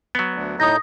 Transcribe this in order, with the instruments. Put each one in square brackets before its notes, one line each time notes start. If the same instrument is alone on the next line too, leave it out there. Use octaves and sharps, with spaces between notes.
[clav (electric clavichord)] F#3 B3
[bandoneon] D2
[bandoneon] A2 D#4 G6 [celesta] D#6 A#6